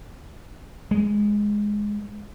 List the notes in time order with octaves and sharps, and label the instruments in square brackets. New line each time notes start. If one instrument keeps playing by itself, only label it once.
[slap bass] G#3